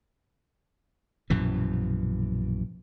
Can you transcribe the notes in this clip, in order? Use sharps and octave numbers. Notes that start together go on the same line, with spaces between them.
A#1 F#2 B2 E3